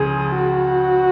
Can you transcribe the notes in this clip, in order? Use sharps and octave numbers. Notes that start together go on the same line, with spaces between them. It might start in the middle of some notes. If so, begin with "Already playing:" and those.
Already playing: C#2 C#3 F3 G#4
F#4